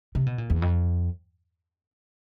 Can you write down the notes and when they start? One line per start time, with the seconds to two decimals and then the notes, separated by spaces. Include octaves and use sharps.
0.15 C3
0.26 B2
0.38 A#2
0.50 E2
0.62 F2